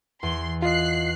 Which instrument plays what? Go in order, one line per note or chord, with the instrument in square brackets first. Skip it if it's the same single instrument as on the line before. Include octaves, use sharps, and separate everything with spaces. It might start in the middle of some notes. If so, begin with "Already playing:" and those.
[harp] E2 [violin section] C6
[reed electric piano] F4 D#5 [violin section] F#6 C7